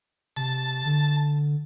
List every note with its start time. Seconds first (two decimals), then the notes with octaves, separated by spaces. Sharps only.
0.37 C3 A5
0.85 D3